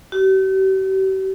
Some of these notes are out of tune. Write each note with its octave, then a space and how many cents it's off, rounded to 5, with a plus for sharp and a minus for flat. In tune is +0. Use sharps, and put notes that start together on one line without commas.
G4 -45